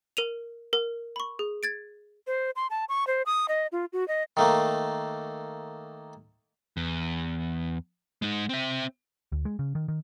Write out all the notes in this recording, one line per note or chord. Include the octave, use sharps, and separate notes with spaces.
A#4 D#7 F7
A#4
B5 C#6
G#4
G#6 A6 D7
C5
C6
A5
C#6
C5
D#6
D#5
F4
F#4
D#5
D#3 A3 A#3
E2
G#3 D#4
C4 E5
D2
G#3
C#3
D#3
D#3